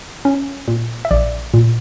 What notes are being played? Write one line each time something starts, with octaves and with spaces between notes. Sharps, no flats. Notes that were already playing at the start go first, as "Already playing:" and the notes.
C#4
A#2
E5
A#1 D5
A#2